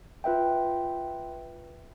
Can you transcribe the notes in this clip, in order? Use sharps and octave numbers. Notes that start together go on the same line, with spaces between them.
F4 B4 E5 G5